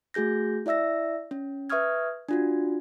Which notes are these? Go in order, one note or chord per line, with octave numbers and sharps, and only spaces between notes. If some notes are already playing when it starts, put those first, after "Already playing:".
A3 F#4 G#4 G6 A#6
E4 D5 E5 E6 A#6
C#4
B4 E5 C#6 D#6 F6 G#6
D4 F4 F#4